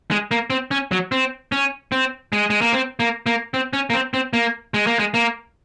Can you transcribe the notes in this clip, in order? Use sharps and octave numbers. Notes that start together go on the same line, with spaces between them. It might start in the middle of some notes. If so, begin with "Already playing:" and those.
G#3
A#3
C4
C#4
F#3
C4
C#4
C4
G#3
G#3
A#3
C4
A#3
A#3
C4
C#4
A#3
C4
C4
A#3
G#3
A#3
G#3
A#3